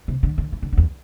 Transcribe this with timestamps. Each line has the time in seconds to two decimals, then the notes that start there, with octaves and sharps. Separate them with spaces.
0.08 C3
0.23 D3
0.38 D3
0.52 E3
0.62 D3
0.73 D3
0.77 E2